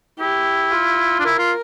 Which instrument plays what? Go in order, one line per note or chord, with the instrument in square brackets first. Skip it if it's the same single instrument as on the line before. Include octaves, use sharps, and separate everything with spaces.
[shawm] E4 [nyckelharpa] G4
[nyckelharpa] F4
[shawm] D4
[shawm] E4 [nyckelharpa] A#4
[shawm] F4